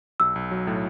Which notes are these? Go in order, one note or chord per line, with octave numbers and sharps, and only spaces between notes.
B1 E6
B1
F#3
A2